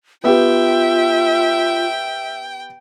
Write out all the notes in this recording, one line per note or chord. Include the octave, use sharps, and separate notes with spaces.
B3 F4 G4 E5 G5